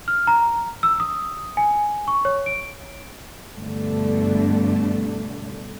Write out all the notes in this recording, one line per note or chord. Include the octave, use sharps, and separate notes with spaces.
F6
A#5
E6
D#6
G#5
C#6
C#5
D7
G2 B2 D3 A3 D4